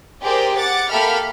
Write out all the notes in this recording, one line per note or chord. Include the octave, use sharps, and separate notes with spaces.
G4 G#4 A#4 C5 D5
F#5 D6 A6
A#3 G4 A4 E5 B5 F6